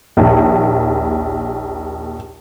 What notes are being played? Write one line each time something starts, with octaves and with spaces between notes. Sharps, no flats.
A#1 D#2